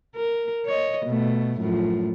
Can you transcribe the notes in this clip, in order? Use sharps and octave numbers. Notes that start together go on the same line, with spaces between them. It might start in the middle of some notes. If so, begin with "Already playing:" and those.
A#4
C#5 D#5
B2 A3
F#2 A2 F3